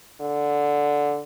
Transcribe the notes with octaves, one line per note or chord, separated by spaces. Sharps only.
D3